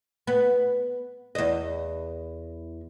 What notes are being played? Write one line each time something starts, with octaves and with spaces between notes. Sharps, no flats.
B3
E2 D#5